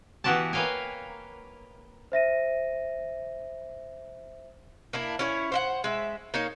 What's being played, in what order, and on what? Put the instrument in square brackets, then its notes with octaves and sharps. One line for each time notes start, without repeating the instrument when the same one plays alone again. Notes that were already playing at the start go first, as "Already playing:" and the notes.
[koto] E3 B3 E4 F#4 G4 A5
A#3 B4 C#5 F5 G5 G#5
[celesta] C5 E5 A#6 D#7
[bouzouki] A#3 D4 E4
C#4 E4 C#5
C5 E5 F#5
G#3 E5
A#3 D#4 C#5